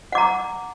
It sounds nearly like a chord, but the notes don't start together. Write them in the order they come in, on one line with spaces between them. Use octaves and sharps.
F#5 D6 A#5